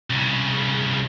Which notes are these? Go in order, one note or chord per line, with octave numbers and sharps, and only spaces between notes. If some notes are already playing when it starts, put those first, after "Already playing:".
C2 C#3